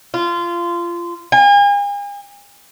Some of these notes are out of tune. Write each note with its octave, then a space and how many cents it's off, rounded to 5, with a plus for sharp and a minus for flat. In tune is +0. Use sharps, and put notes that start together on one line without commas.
F4 -20
G#5 -40